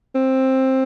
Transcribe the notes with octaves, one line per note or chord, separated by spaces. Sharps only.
C4